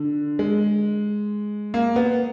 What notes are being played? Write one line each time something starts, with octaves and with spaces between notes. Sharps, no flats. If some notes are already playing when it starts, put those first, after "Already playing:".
Already playing: D3
G#3
A#3
B3